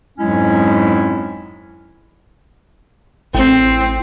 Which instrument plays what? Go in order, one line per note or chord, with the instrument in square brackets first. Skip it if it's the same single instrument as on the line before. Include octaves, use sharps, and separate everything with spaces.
[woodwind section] F2 G#2 F#3 G#3 C#4 E4
[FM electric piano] A1 E4 G5 [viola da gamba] C4